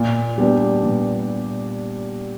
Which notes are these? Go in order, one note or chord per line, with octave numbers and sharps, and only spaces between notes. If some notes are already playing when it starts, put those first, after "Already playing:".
Already playing: A#2
G3 B3 D4 G4
A#2